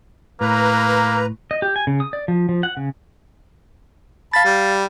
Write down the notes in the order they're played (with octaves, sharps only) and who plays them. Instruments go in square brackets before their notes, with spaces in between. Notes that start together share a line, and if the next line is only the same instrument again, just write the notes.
[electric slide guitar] A2 [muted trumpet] A#3 [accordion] B4 A#5
[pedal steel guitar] D#5
G4
G#5
C#3
D#6
D5
F3
F3
F#5
C#3
[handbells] F5 A6 [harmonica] A5 B5
[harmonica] G3